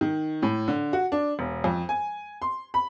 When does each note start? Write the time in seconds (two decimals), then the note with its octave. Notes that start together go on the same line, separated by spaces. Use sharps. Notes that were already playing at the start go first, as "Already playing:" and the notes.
0.01 D#3
0.42 A2
0.68 D3
0.93 F#4
1.12 D4
1.39 E1
1.64 F2
1.89 G#5
2.42 C6
2.74 B5